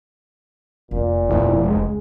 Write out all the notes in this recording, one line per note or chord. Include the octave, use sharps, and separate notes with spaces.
F1 A#2
F1 G2 B2 E4
C#2 G#3